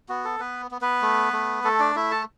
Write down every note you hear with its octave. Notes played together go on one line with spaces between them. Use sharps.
B3 F#4
A4
B3 B4
B3
B3 B4
A3
A3
A3 A4
D4 D5
A3 E4 E5
A4 A5